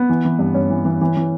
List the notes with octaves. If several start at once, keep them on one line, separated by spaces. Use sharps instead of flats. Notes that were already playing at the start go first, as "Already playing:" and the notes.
Already playing: B3
E3
E3
G2
G2 C#4
E3
E3
E3
E3